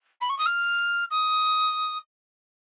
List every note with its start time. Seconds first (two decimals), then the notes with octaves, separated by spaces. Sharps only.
0.20 B5
0.29 C#6
0.38 D#6
0.46 F6
1.10 D#6